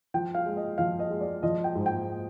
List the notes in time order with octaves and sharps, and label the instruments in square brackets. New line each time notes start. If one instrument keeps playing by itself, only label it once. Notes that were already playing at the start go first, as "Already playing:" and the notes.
[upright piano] F3 G5
F5
G#3
D#5
F3 F5
D#5
G#3
D5
F3 D#5
G5
G#2
G5